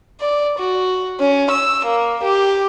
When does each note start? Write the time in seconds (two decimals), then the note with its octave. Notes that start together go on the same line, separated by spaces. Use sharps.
0.20 D5
0.59 F#4
1.20 C#4
1.51 E6
1.85 A#3
2.23 G4